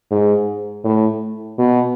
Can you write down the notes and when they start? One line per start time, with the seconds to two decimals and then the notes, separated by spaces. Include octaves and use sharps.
0.11 G#2
0.84 A2
1.58 B2